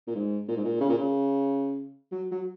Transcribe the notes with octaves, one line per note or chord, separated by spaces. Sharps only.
A#2
G#2
A#2
G#2
A#2
C#3
A#2
C#3
F#3
F#3